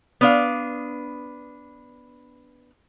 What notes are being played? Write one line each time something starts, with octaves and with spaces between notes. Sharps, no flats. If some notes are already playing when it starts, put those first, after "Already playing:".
B3 D4 F5